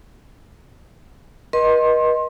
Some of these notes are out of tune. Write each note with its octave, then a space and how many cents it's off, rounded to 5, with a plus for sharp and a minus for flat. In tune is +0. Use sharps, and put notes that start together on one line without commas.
B4 -45 D#5 +0 C6 +25